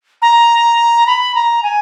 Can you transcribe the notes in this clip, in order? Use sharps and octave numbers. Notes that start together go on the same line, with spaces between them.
A#5
B5
A#5
G#5